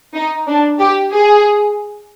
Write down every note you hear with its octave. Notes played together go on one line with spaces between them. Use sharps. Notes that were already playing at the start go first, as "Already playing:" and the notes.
D#4
D4
G4
G#4